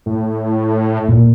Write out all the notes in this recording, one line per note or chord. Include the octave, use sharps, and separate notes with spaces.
A2
A#2